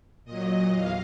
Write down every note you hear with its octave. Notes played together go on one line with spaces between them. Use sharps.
A#2 F#3 D#5
E2 F5